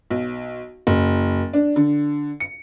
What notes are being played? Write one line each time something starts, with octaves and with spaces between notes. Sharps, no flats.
B1
F#1
D4
D3
C#7